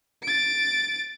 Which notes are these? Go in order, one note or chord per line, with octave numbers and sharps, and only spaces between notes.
A6 D7